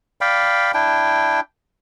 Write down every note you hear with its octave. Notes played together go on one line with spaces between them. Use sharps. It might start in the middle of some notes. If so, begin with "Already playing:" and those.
D5 F5 G5 B5
D4 E4 G5